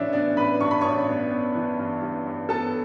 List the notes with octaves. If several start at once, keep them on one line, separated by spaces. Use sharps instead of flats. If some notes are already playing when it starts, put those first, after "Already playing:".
Already playing: A1 E3 C#4 D4 C#5 D5 E5
B3 D4 D5
A1 B4 B5
G2 C#6
B5
A1 C#5 C#6
B3
B3
E3
G2
G2
G2
B3 A4 A5